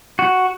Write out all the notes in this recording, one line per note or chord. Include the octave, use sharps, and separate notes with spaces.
F#4